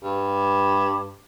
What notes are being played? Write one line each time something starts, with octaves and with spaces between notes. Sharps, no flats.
G2